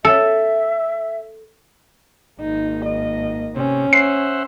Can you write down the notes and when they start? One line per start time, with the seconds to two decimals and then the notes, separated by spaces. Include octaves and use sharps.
0.05 A4 E5
2.40 G#1 A#3 D#4
2.85 D#5
3.56 C3 C#4
3.93 C5 E5 F#5 C7